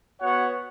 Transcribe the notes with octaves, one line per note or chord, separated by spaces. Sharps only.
B3 F#4 C#5 F#5